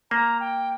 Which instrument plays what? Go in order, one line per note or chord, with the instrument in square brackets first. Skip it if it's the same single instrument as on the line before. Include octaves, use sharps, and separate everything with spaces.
[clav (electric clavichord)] A#3 [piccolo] A#5
[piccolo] G5